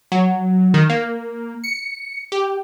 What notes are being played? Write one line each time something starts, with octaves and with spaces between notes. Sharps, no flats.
F#3
D#3
A#3
C#7
G4